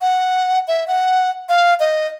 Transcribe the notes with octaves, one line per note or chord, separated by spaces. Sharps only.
F#5
E5
F#5
F5
D#5